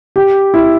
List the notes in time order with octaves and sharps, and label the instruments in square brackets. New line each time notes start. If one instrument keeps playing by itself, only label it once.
[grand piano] G4
E4